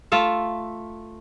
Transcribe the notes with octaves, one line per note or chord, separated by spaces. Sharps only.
A3 F4 E5 F5